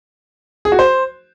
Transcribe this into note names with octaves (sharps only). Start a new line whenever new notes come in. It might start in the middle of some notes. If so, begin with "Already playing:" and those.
G#4
F#4
C5